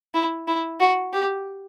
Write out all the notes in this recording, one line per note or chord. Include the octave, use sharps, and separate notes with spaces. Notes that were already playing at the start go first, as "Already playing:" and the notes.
E4
E4
F#4
G4